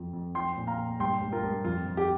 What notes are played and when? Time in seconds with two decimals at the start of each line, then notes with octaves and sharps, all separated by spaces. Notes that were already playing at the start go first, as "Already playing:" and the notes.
Already playing: F2 F3
0.13 F2
0.35 F3 G5 C6
0.57 A#2
0.67 F5 A#5
0.78 A#2
1.00 G2 G5 C6
1.21 G2
1.32 F4 A#4
1.43 G2
1.64 F2 F4
1.86 F2
1.97 G4